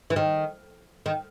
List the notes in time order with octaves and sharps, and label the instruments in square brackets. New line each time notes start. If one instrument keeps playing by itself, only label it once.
[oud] E3
D#3
D#3